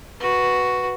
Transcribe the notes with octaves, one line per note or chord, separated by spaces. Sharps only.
F#4 B4